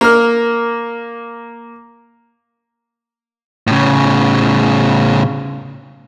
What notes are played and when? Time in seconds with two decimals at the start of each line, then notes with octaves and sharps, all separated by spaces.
0.01 A#3 F6
3.67 A2 C#3